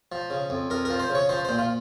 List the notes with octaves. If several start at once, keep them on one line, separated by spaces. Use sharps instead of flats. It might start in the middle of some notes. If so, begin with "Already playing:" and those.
F3
C#3
F2
F2 A#4
F3 A#4
C5
C#3
C#5
F3 C5
A#2 C5
F4